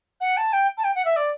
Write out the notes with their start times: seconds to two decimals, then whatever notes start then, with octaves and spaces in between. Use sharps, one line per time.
0.21 F#5
0.37 A5
0.53 G5
0.78 A5
0.84 G5
0.95 F#5
1.05 E5
1.16 D5